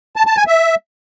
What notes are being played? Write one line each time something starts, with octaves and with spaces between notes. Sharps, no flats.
A5
A5
G#5
E5